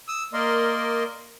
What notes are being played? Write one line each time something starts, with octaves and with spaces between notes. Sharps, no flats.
D#6 E6
A#3 A#4 D5 D#5 C6